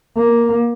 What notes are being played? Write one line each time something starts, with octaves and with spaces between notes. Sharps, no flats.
A#3